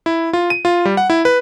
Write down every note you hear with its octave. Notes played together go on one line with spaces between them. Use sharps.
E4
F4
D#7
F4
G3
F#5
E4
B4